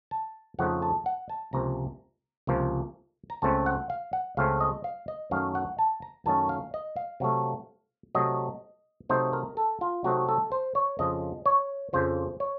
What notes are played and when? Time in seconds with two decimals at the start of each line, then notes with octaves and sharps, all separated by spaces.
0.11 A5
0.59 F2 C#3 F3 A3 D#4 F#5
0.82 A5
1.06 F#5
1.29 A5
1.53 C#2 C3 F3 A#3 A#5
2.47 C#2 C3 F3 A#3
3.30 A#5
3.42 C#2 C#3 A3 C4 A5
3.66 F#5
3.90 F5
4.13 F#5
4.37 C#2 C#3 A3 C4 F5
4.61 D#5
4.84 F5
5.08 D#5
5.31 F#2 D#3 F#3 A3 C#4 F5
5.55 F#5
5.79 A5
6.02 A#5
6.26 F#2 D#3 F#3 A3 C#4 A5
6.49 F5
6.74 D#5
6.96 F5
7.20 C3 F#3 A3
8.15 C3 F#3 A3 D#5
9.09 C3 F#3 A3 C4 D#4 C5
9.33 A#4
9.57 A4
9.81 F4
10.04 C3 F#3 A3 C4 D#4 F#4
10.29 A4
10.52 C5
10.75 C#5
10.99 F2 C#3 F3 D#5
11.46 C#5
11.93 F2 C#3 F3 C5
12.40 C#5